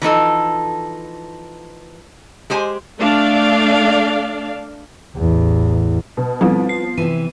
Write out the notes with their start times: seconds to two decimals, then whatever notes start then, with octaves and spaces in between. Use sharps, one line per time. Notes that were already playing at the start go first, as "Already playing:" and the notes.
0.02 E3 F3 D#4 A4
2.50 G#3 G4 C5 G#5
3.00 A3 D4 D5 F5
5.17 A1 E2
6.17 B2
6.41 F3 G3 B3 C4
6.69 C7
6.98 C3 E3 D#7